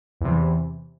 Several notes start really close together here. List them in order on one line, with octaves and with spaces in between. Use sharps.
E2 C3 E3